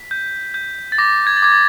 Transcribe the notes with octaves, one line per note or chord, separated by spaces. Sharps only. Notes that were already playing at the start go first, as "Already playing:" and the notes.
Already playing: B6
G6
G6
A6
D6 A#6
G#6
A6
D6 G#6
A6